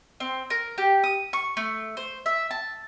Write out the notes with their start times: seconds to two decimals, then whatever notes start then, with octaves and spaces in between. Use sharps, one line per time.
0.20 C4
0.50 A#4
0.78 G4
1.04 D#6
1.33 C#6
1.57 A3
1.97 C5
2.26 E5
2.51 A5